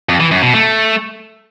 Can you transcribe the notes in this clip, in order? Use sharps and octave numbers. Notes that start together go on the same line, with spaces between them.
F2
E3
F#2
B2
A3